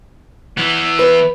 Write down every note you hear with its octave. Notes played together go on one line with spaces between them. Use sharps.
E3 B3
B4